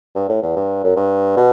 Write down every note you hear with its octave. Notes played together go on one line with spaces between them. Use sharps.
G2
A2
E2
G2
F#2
G2
B2